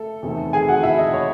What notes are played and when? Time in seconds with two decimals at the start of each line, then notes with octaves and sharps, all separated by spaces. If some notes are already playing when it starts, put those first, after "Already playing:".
Already playing: A3 A4
0.23 E2 C3 D#3 A3
0.53 G#4 G#5
0.68 F#4 F#5
0.83 E4 E5
0.98 D#5
1.14 C#5